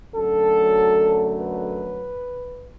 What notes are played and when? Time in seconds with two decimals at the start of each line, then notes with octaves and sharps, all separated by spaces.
0.15 F#2 D3 F#3 A3 A4
1.39 B4